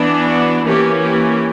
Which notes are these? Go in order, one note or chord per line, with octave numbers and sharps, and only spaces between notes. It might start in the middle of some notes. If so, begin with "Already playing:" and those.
Already playing: E3 B3 D4
F#4
E3 A#3 C#4 G4
G4